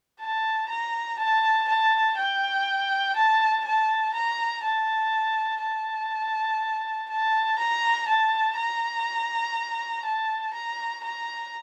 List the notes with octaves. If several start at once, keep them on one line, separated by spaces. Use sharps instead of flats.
A5
A#5
A5
A5
G5
A5
A5
A#5
A5
A5
A5
A#5
A5
A#5
A5
A#5
A#5